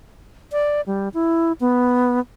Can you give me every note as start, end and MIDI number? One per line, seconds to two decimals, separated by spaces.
0.52 0.81 74
0.87 1.09 55
1.14 1.52 64
1.61 2.20 59